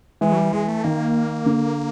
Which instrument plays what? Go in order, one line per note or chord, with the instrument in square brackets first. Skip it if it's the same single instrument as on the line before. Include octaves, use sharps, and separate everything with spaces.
[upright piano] E3 [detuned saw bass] G#3
[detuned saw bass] F#3
G3
[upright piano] E3 [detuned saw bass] G#3
[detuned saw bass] A3
[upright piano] D#3 [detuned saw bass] A#3
[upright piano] D3